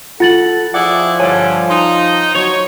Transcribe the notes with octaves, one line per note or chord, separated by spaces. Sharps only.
F4 A4 F#5 A6 F#7
F3 E4 G#4 D5 F#5
G2 D3 G3 C#5 G#5 A5
D#4 C6
F#3 C#5 F7